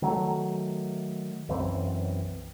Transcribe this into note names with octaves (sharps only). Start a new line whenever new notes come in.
D#3 F#3 A3
B1 F#2 E3 C4